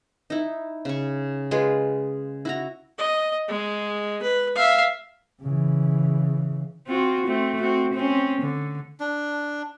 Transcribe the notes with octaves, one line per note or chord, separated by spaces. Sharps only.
D#4 E4
C#3 C#6
G#3 F4 G#4 B4
E4 F#4 A#5
D#5
G#3
B4
E5 F5
C#3 E3
C4 F4 F#4
A3 C4
C4 F#4
C4 C#4
D3
D4